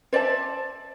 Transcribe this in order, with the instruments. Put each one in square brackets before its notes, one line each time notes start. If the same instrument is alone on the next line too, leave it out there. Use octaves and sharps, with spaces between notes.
[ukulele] C5 D5 E5 A5